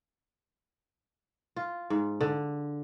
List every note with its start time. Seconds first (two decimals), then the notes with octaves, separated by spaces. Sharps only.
1.56 F4
1.90 G#2
2.21 D3